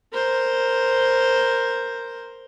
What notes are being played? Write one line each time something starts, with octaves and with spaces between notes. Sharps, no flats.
A#4 C5